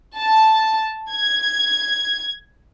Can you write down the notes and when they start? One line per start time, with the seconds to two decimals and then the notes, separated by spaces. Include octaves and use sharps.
0.18 A5
1.10 G#6